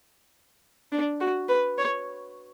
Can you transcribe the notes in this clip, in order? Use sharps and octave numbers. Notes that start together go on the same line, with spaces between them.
D4
F#4
B4
C#5